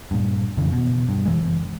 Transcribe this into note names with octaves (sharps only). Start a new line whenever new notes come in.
G2 A#2
F2 C#3 E3
B2
G2
F#1 E3 G#3